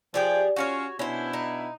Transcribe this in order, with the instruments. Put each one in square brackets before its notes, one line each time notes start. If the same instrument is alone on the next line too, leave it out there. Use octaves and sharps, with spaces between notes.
[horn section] F3 G5 [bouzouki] G4 G#4 D5
[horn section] C#4 F4 F5 [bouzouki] F#4 A#4 C#5
[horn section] B2 D4 E4 [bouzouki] C#4 C5
[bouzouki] D#4